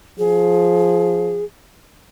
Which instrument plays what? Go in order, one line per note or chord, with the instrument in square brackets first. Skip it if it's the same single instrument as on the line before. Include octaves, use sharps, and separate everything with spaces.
[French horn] F3 [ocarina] G#4